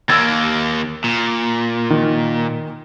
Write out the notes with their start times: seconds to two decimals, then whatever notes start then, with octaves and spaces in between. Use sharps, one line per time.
0.09 D#2 A#3 E6 G#6 A6
1.04 A#2
1.90 D#3